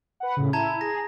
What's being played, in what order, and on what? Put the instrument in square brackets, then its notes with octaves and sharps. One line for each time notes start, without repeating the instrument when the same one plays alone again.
[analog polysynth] B4 F#5
A2 C#3
[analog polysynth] E4 [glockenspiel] A5 A#5 G#6
[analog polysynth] G#4 [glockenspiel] A#6